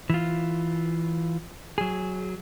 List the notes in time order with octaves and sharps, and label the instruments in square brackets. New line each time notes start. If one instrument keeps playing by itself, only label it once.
[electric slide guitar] E3 F4
F#3 G#4